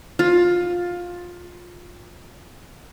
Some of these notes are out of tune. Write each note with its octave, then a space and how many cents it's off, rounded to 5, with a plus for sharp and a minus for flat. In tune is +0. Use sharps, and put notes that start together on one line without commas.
F4 +15